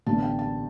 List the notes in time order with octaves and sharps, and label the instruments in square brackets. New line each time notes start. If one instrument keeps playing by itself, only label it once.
[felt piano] A1 G2 D3 G3 B3 A5
G5
A5